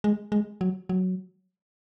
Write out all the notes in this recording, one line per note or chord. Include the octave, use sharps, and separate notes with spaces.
G#3
G#3
F#3
F#3